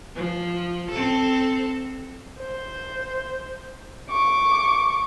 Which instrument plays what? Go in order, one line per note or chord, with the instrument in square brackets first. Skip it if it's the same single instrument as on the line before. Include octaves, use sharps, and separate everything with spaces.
[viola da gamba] F3
C4 A4
[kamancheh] C5
C#6 D6